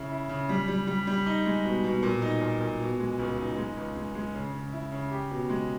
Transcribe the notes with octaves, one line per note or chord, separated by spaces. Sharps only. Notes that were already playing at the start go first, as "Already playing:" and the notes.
Already playing: C#3 E4
E4
C#3
G3
G3
G3
G3
D#4
G#3
B2
B2
A#2
D#4
A#2
A#2
B2
G#3
C#2
D#4
G#3
C#2
G#3
G#3
C#3
C#3
E4
C#3
G4
B2
G#3